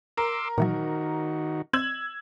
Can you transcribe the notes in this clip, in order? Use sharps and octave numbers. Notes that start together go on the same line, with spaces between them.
A#4 C6 D6 E6
A#2 D#3 E3 F#3 D#4 F#4
C4 E6 G#6 F#7